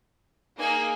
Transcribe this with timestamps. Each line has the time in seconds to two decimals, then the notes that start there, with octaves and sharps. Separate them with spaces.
0.57 A#3 D#4 G#4 G#5